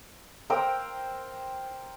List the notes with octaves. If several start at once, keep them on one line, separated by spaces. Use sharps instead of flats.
A#4 C5 G5 E6